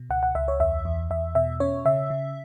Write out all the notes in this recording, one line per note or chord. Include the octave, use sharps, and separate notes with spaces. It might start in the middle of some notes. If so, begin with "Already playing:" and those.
Already playing: B2
C#2 F#5
F#5
C#2 E5
C#5
E2 E5
E2
E2 E5
B2 E5
C#4 C#5
C#3 E5
C#3